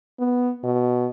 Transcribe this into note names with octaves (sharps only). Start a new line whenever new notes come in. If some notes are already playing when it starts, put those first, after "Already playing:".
B3
B2